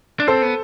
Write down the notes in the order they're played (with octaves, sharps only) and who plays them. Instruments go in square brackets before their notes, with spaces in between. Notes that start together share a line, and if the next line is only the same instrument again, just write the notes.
[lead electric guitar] D4
[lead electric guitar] C4 [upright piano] A4 C5
[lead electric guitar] B3